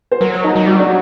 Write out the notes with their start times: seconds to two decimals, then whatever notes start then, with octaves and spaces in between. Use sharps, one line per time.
0.12 C5
0.20 F#3 A#4
0.44 D#4
0.55 F#3
0.66 G3 F#4
0.76 F#3 D4